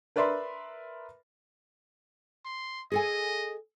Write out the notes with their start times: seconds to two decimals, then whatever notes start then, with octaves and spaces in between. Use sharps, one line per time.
0.16 A#4 B4 D5 E5 B5 C6
2.45 C6
2.92 G#4 A4 D#5 G#5